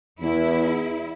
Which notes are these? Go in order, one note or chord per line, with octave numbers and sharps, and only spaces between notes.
E2 E4